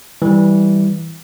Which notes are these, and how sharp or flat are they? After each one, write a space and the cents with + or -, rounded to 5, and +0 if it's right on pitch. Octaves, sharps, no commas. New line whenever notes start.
E3 -15 G3 +0